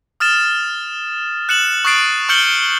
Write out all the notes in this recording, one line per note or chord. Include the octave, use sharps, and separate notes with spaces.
D#6 F6 A6 E7
F#6 C#7 E7 F#7
C#6 D#6 F#6 A6 C7 D7
C#6 F6 G6 C#7 F#7 G7